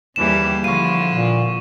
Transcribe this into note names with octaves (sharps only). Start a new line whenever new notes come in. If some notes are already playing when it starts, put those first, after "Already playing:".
D#2 D3 E3 G3 G4 G#4 E7
D3 F3 E4 F5 C#6 D#7
A#2